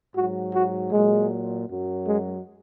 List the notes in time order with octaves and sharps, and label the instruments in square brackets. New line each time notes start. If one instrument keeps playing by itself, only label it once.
[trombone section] G#2 F#3 F#4
F#4
A#2 F#3 G#3
F#2 F#3
G#3